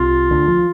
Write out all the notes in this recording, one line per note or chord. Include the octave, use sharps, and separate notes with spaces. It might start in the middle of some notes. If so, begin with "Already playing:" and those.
Already playing: C2 C3 F4
D2 D3
F3